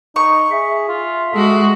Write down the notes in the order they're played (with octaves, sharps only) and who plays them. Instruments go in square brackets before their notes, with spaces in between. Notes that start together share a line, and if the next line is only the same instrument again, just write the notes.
[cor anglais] D#4 [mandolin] C#6
[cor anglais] G#4 [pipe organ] E5
[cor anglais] F4
[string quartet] G#3 F#4 [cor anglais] A4